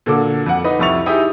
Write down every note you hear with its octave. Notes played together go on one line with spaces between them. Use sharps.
A#2 D3 A#3 F#4 A4 D6
F2 F#5
D#4 B4 D#5
C2 F2 E4 C#6 A6 F7
D#4 E4 G4 G#4 D#5